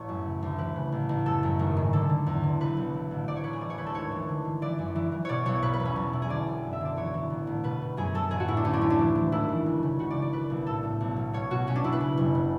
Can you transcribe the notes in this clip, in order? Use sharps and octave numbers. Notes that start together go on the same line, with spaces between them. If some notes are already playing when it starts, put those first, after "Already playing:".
Already playing: A1 C#5
F#2
C#3
D2
E3 B4
C#3
A1
A1
F#2 A4
F#2
G#1
G#2
D3 A4
D3
E2
D3
B1 B4
B1
E3
A1
A1 D5
C#5
A1 B4
G#4
E3 D5
C#5
D2 B4
A4
G#1 C#5
E3
D3
D3
E3 D5
F#2
E3
E3
B2 C#5 D5
B1 C#5
B2 B4
B4
E2
C#4
B1
B2 E4
G#4
D3 D5
E1
F#2
E5
D3 D5
E3 C#5
E3
A1
A1
B2 B4
B2
F#2 G#4
F#2 A4
A1 G#4
F#4
A2 E4
D4
D2 C#4
D4
D3 C#4
D4
E3
E3
G#1 E4
E3
C#2
C#3
C#3 F#4
D5
C#3
D5
E3 B4
B1
A2 A4
A2
B1
B2
B2 C#5
B2 F#4
B2 C#4
D4
B2 E4
B4
C#3
F#1
C#3